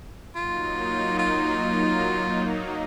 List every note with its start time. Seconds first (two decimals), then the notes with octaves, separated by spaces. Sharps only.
0.35 F#3 A#3 D#4 F4
1.19 F4